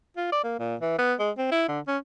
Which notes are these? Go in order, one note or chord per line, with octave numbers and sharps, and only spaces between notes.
F4
D5
A#3
A#2
E3
B3
G#3
C4
E4
D3
C#4